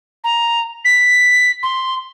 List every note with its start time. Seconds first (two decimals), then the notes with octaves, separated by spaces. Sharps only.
0.24 A#5
0.85 B6
1.63 C6